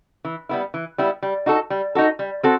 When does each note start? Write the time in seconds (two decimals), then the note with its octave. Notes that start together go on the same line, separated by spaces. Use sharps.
0.25 E3
0.49 G3 B3 E4
0.74 E3
0.98 G3 B3 E4
1.23 G3
1.46 D#4 F#4 A4
1.70 G3
1.95 D#4 F#4 A4
2.19 G3
2.43 C4 F#4 A4